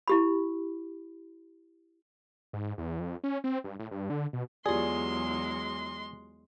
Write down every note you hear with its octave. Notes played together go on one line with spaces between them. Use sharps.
E4 G4 B5
G#2
E2
F2
C#4
C4
G2
A2
G2
D3
B2
E2 F#3 G#3 F4 G4 G#4 D5 C6